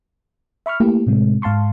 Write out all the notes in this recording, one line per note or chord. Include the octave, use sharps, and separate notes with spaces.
E5 B5 C#6 F6
A3 A#3 E4 G4
A2 C3 G#3
G#2 F5 A5 C6 C#6